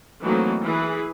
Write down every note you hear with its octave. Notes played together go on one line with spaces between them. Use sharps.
E3 F#3 A3 A#3 C4 D#4
E3 G#4 B4